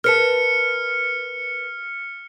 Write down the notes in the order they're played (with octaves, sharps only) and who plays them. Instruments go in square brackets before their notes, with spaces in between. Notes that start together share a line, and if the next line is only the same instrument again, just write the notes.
[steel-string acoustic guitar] A#4 B4 A5 [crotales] F6 C#7